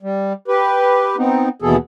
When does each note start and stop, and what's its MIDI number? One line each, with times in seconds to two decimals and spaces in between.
0.03 0.33 55
0.48 1.16 67
0.48 1.16 71
1.18 1.49 59
1.18 1.49 60
1.18 1.49 63
1.62 1.76 39
1.62 1.76 47
1.62 1.76 52
1.62 1.76 59
1.62 1.76 68
1.62 1.76 69